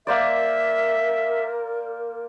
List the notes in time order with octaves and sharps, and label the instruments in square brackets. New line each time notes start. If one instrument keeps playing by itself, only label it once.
[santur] A#3 C5 D5 [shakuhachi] A#4 [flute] E5